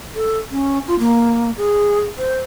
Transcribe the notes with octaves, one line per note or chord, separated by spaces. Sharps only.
A4
C#4
F4
A#3
G#4
C5